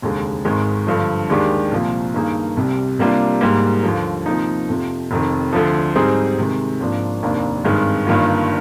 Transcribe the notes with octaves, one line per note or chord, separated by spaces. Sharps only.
F1 D#2 D3 G#3
G#1 G#2 D#3 G#3
G2 D3 F3
D#2 D#3 G#3 D4 G4
C2 A#2 F3 A#3
G2 D#3 A#3 D#4 G#4
C2 C3 G3
C3 G3 A#3 D4 F4
G#2 G3 A#3
D#2 D3 F3
C3 F3 A#3 D#4
F2 C3 F3
F1 F2 D#3
D2 D3 F3
G#2 G3 C4 D#4 G#4
C3 D#3 G#3
G#1 G#2 F3 A#3 D4
F1 D#2 D#3 A#3 D4
G#1 G2 D#3 G#3
G1 G2 D#3 A#3 F4